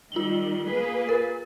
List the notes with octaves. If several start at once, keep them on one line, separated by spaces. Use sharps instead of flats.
D#3 G3 F4 F#7 G7
A#3 G#4 B4
A#4